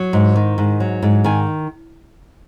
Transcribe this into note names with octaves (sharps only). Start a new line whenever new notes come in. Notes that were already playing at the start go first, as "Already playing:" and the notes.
Already playing: F#3
G#2
D#3
G#2
F#3
G#2
D#3 G#5